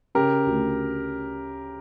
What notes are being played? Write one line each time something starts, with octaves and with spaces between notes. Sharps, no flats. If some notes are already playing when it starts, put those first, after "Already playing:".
C#3 G4 A#4
D2